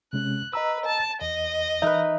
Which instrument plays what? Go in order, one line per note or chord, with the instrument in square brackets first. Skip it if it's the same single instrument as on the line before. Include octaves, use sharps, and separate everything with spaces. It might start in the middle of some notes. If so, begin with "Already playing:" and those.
[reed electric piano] C3 G#3 C#4 [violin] F#6
[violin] B4 [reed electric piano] D#5 A#5 E6
[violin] A5
[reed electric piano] E2 [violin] D#5
[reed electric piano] E3 E5 [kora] D#4 A#4 B4